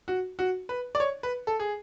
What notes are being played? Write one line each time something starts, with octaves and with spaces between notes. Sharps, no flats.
F#4
F#4
B4
D5
C#5
B4
A4
G#4